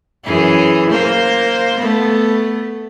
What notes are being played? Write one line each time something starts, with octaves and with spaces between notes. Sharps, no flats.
F#2 E3 G#4
A#3 C5
A3 B3